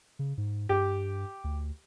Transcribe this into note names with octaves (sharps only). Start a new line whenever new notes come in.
C#3
G#2
G2 G4
D2